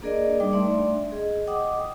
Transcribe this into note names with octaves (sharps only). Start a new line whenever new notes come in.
A#3 D4 G#4 A#4 D5 D#5
G3 D#4 G5 D6
A3 D4 D5 E5 C6
G#4 D#5
D#5 F#5 G5 D6 D#6